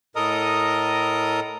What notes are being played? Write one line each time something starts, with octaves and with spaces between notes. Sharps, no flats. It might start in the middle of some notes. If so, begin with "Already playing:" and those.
A2 A4 A#4 D#5 A#5 D#6